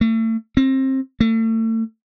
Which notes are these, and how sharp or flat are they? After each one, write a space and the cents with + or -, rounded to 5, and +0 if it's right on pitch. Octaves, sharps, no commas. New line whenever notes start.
A3 +35
C4 +25
A3 +35